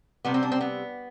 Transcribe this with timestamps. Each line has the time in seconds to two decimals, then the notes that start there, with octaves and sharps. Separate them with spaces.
0.25 C3 G3 B3
0.34 C4
0.43 D4
0.52 C4
0.61 B3